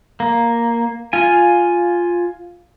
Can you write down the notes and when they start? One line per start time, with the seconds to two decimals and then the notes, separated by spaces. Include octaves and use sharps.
0.20 A#3
1.13 F4 G#5